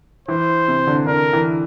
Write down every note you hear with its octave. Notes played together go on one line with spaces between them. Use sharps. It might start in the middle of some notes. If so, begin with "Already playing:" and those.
E3 C5
C3
D3
D3 A#4
E3